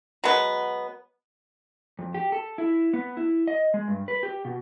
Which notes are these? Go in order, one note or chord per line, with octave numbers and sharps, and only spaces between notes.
F#3 G#3 B3
F2
G4
A4
E4
B3
E4
D#5
G#3
G2
B4
G4
B2